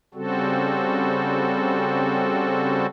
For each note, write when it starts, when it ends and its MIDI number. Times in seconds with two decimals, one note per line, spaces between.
0.14 2.86 49
0.14 2.86 55
0.14 2.86 60
0.14 2.86 66
0.14 2.86 69